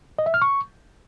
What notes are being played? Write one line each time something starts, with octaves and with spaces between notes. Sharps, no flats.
D#5
E5
F6
C#6